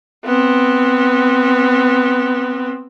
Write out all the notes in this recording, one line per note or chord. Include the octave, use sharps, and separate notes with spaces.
B3 C4